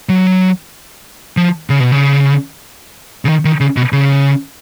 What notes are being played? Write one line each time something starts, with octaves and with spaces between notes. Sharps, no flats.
F#3
F3
C#3
B2
C#3
C#3
D#3
D#3
C#3
B2
C#3